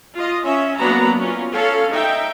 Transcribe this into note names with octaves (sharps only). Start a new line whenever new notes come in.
F4 D#5
C#4 E5
F#3 A#3 B3 D4 A#5 B5
C#4 F4
C#4 A4 F5
D#4 E5 G5